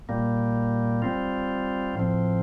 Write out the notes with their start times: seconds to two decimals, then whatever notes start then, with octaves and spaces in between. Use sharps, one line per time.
0.09 A#2 G3 A#3
1.02 G3 C4 F4
1.95 A2 F3 C4